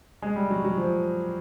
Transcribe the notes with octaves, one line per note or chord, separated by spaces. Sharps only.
G#3
G3
F#3
F#3
F3